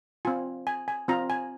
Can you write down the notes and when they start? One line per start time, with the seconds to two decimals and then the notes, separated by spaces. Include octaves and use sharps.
0.25 C4 F4 G#5
0.67 G#5
0.88 G#5
1.08 C4 F4 A#5
1.30 G#5